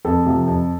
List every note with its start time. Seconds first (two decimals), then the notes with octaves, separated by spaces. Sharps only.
0.05 F2 A4
0.26 C3 F3
0.47 F2